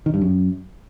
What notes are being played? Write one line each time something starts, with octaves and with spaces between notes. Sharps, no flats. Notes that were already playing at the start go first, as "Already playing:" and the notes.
D#3
G2
F#2